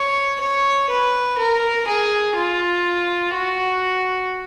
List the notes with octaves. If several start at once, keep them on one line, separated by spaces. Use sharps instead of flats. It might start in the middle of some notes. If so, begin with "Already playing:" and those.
Already playing: C#5
C#5
B4
A#4
G#4
F4
F#4